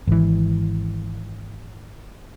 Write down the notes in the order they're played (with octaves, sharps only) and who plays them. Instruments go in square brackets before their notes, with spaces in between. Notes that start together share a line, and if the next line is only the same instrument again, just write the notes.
[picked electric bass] G#1 E3